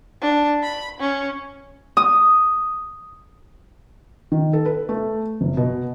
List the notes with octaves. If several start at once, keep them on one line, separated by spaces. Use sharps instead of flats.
D4
B5
C#4
D#6
D#3
A4
B4
A3
F#1
B2